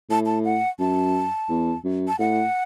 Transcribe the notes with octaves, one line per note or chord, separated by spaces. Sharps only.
A2 A5
A5
F#5
F#2 A5
E2
F#2
A5
A2 F#5